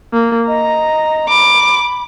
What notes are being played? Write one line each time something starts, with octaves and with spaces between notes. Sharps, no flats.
A#3
D#5 A#5
B5 D6